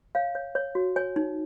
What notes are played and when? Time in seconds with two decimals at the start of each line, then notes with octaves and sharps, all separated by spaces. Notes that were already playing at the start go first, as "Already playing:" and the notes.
0.15 C#5 F5
0.35 C#5
0.55 C#5
0.75 F#4
0.96 C#5 G#5
1.16 D#4